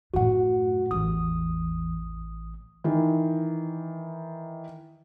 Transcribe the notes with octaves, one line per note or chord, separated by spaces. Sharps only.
F#2 A2 F#4 F#5
A1 E2 D#6
D#3 E3